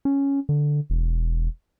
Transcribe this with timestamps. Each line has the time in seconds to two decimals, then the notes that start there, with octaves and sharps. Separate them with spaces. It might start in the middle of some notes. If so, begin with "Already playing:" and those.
0.05 C#4
0.49 D3
0.90 E1